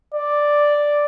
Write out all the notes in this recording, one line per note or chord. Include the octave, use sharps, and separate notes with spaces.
D5